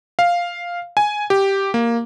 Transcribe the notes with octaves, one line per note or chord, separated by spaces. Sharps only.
F5
G#5
G4
A#3